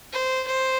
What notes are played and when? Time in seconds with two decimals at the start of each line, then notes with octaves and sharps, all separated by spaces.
0.12 C5
0.47 C5